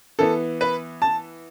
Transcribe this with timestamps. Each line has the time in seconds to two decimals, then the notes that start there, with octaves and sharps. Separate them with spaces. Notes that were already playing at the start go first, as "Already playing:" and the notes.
0.19 E3 B3 A4
0.61 B4
1.02 A5